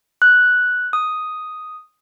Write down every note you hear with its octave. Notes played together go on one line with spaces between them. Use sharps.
F#6
D#6